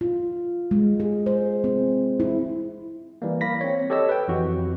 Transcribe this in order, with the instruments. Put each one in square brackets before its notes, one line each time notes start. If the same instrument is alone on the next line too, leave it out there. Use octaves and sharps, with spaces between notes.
[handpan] F4
G#3
G#4
C5
C4
E4
[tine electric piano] E3 G3 A#3
A#3 B5 A#6 B6
C4 C#5
G4 A4 C#5 D#5 E6
B4 G5
F2 E3 F#4